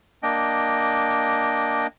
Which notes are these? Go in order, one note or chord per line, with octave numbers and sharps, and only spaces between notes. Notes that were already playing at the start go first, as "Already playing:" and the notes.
A#3 D4 D#5 G5